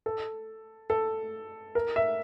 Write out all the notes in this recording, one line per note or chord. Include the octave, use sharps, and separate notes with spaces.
A4
A4
A#4
E5